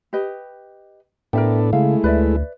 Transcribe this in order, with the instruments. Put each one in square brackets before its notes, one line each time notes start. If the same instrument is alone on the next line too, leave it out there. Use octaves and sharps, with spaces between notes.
[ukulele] G4 B4 D#5
[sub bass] A2 [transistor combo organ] B3 D4 A4 [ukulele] A#4 E5 G5
[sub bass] C#3 [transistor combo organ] G#3 A3 E4 [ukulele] F5
[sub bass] D2 [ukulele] B4 D5 E5